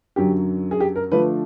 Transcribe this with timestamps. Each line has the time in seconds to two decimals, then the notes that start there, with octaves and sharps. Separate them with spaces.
0.16 F#2 D3 F#3 G4
0.71 G#4
0.80 G4
0.96 A#4
1.12 D3 F3 A3 D4 B4